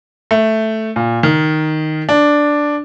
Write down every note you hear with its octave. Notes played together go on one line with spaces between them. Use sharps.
A3
A#2
D#3
D4